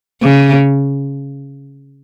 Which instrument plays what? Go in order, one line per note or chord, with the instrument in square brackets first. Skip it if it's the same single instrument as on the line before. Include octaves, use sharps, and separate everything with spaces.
[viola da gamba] C#3